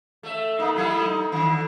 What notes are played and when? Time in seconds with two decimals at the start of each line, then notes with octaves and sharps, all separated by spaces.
0.23 A3 E5
0.59 A3 A#3 D#4
0.76 F#3 A3 E4
1.06 D#4
1.32 D3 D#3